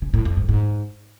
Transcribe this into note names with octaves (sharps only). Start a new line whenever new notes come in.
C#3
A2
F2
G#2
G#2